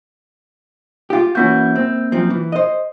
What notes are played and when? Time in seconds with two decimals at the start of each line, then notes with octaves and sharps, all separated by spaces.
1.10 F4 G4
1.35 E3 A#3 C#4 F#4 G6
1.75 C4
2.12 F#2 F3 C4
2.30 E3
2.52 C5 D#5